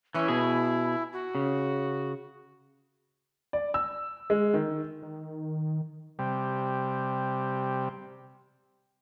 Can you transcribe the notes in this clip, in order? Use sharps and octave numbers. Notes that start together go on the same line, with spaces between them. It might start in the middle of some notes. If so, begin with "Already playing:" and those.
E3 C#4 E4
B2 G#4
F#4
C#3
D5
E6
G#3
D#3
D#3
C3 G3